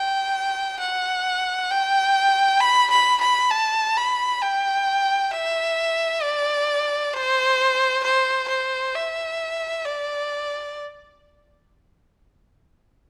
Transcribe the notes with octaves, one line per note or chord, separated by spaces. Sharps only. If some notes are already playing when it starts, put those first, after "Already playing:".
Already playing: G5
F#5
G5
B5
B5
B5
A5
B5
G5
E5
D5
C5
C5
C5
E5
D5